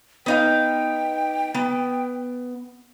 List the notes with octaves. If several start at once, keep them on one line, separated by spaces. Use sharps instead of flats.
B3 D#4 F5 G5
B3